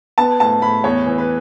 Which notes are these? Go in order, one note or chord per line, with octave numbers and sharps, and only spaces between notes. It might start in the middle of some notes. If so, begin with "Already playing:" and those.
B3 A5
A2 A5
A2 B5
E2 C#5
E3
B4